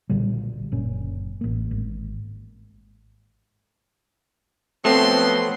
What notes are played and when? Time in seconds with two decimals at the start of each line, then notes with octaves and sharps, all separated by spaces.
0.09 B1 A#2 D3 G3
0.72 F#1 A#2 C#4
1.41 A1 A#3
1.71 G#1
4.85 F3 F#3 A3 B3 C4 C6